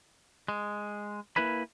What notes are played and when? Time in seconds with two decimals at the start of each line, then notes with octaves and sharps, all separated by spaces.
0.48 G#3
1.36 A#3 E4 B4 G#5 B5